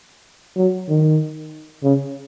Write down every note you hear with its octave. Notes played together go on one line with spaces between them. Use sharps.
F#3
D#3
C#3